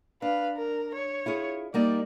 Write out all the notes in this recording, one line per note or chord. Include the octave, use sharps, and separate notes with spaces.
D4 B4 F5
A#4
C#5
E4 F4 G#4
G3 A#3 D#4 D5